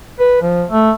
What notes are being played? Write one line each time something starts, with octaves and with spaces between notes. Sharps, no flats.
B4
F3
A3